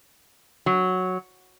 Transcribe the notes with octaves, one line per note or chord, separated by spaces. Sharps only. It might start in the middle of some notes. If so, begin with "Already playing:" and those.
F#3